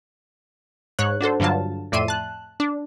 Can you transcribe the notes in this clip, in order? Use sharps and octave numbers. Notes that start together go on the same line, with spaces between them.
G#2 C#5 F#6
D4 F#4 A4 C5
G2 D3 F#3 F4 A5
F2 A2 D5 E5 C6 D#7
A5 F#6
D4